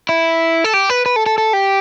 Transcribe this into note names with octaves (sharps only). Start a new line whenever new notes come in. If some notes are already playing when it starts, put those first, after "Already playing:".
E4
A4
G4
B4
B4
A4
A4
A4
G4